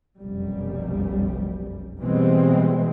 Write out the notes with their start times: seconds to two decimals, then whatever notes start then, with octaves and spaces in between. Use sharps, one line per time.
0.17 F1 B1 F#2 G3
2.01 B2 E3 G3 G#3 C4